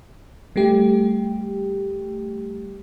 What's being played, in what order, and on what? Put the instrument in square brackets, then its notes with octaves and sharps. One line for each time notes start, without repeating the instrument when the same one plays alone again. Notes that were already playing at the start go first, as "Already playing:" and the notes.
[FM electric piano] G3 A3 G4